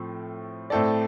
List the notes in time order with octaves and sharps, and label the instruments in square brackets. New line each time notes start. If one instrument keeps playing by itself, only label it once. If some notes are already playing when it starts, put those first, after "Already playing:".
Already playing: [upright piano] A2 F3 A3 C4
A2 A3 C4 A4 D5